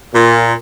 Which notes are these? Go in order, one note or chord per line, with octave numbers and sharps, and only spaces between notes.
A#2